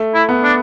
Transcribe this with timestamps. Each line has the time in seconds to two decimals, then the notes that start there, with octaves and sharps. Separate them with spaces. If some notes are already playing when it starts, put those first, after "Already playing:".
Already playing: A3
0.14 E4
0.29 B3
0.43 D4